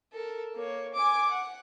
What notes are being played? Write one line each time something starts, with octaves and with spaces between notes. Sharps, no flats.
A4 A#4
A#3 C#5
G#5 D6
F#5